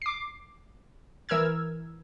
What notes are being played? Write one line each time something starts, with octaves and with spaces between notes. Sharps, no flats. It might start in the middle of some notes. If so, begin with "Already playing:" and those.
D6 C7
E3 A#4 E6 F6 G#6